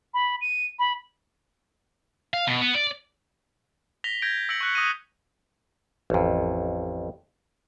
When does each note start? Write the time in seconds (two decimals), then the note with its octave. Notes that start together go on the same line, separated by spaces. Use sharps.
0.14 B5
0.41 D#7
0.79 B5
2.34 F5
2.47 B2
2.61 B3
2.75 D5
4.04 A#6 B6 F7 G7
4.22 G6 G#6 A#6 D7
4.49 E6 A#6 C#7 D7 F#7
4.61 C#6 F#6 C#7
4.75 D#6 A#6 D#7
6.10 A1 F2